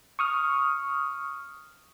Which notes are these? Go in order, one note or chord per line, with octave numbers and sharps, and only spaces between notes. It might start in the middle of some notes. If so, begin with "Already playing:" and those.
C#6 D#6 F6